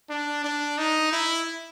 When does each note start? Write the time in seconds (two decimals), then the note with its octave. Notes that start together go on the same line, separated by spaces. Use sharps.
0.10 D4
0.44 D4
0.78 D#4
1.12 E4